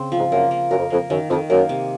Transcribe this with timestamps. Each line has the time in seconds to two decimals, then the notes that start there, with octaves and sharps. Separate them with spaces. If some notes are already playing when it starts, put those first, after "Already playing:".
Already playing: C#3 C4
0.12 F3
0.18 G#2
0.32 F#2 A#3
0.51 A#3
0.71 F#2 A#4
0.78 F2
0.90 F2 A#3
1.10 F#2 D#3
1.30 F2 D#3
1.50 F#2 A#3
1.69 C3